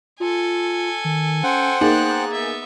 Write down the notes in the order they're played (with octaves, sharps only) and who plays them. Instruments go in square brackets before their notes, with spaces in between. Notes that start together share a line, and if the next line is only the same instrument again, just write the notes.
[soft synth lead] F4 [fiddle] A4 G#5
[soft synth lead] D#3
[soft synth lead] C#4 [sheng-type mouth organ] C5 F#5 G5
[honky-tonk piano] A#3 D#4 G#4 [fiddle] B3 F#6 [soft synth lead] A6
[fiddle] B3 E5